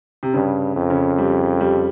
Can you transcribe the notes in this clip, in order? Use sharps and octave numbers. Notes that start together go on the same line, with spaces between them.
C3
G2 C#3
F2
C#3
G3
G3